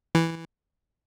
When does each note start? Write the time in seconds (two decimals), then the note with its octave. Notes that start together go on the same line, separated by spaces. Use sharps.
0.15 E3